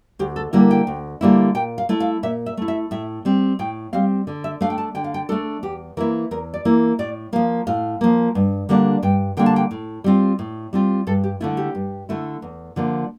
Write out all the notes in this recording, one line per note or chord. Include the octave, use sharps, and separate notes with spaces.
D2 G4
A4
D3 G3 A#3 E4 A#4
G5
D2
D3 G3 A#3 E4
A#2 G5
F5
A3 E4
F5
A#2 E5
E5
A3 E4
E5
A2 E5
G3 C4
A2 G5
G3 C4 F5
D3
E5
A3 D4 F5
G5
A5
D3 G5
F5
G5
A3 D4 A4
E2 G4
E3 A#3 E4 A#4
E2 A#4
D5
E3 A#3 E4
A2 D5
F3 A#3 F5
A2 F5
F3 A#3
G2
D3 G3 A#3 D4
G2 G5
D3 G3 A#3 D4 G5
A5
G5
A2
G3 C4 F4
A2
G3 C4 F4
G2 A4
G4
D3 A3 E4 F4
G4
G2
D3 A3 E4
E2
D3 F3 A#3